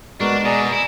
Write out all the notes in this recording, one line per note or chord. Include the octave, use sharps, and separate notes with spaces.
G#3 B3 D4 F#4 A#4 D5
B2 G#4 D5 A#5
E4